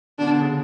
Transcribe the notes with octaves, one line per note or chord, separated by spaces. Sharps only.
B2 D3 D4
B2 D3
C#3